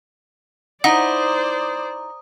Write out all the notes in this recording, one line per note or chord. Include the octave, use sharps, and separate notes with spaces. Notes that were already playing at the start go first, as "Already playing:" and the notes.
D#4 E4 C5 D5 F#5 A#5 D#6